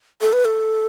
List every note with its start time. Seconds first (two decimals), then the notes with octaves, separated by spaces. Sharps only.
0.21 A4
0.33 B4
0.45 A4